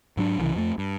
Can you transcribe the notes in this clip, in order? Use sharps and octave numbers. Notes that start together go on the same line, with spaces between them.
G#2 F#3 D4
C2 C#3 E3
F2 A3
G2